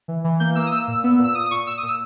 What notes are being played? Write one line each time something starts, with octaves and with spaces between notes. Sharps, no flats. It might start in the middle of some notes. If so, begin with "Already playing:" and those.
E3
E3
A#3 G6
A#3 E6
D#6
A#3 E6
A#2
B3
A#2
E6
A#2 D#6
D#6
A#2 C#6
A#2 E6
D#6
A#2
E6